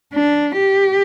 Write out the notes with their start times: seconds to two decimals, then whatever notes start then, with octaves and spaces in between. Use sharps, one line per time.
0.14 D4
0.57 G4